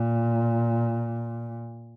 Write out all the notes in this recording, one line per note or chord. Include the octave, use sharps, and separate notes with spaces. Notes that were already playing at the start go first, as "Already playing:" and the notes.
Already playing: A#2